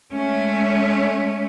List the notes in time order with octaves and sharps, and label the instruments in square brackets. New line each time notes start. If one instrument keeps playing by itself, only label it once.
[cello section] G#3 A3 C#4